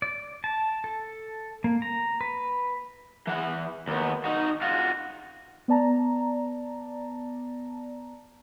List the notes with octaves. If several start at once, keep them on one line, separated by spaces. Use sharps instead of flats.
D5
A5
A4
A#3
A#5
B4
E3 F#5
D#2 B3
D#4 F#4
F4 F#4
B3 D5 A5 A#5